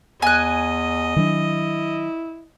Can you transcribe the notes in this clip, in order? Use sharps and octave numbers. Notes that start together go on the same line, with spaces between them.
E2 D#5 G#5 F#6
D#3 F#3 D4 E4